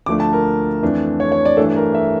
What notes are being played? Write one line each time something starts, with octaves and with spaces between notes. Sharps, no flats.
D2 D3 F3 A3 D4 D6
A5
A#4
F2 E3 A3 D4
C#5
C#5
D5
G2 E3 A3 D4 A4
A#4
E5